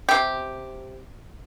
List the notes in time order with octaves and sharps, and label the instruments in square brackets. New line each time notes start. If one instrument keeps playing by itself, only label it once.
[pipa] C3 G4